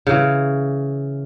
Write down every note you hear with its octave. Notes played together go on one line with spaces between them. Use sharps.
C#3 E3